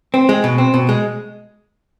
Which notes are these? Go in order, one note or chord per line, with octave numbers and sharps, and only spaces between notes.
C4
G#3
B2
C4
B2
G#3